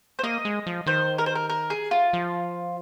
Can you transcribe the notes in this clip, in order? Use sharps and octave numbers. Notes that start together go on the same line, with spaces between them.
C5
A#3 D#5
G#3
F3
D#3 C5
A#4
C5
A#4
A#4
G#4
F4
F3